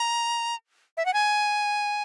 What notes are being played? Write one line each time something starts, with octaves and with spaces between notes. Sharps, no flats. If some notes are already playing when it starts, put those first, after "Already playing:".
Already playing: A#5
E5
F#5
G#5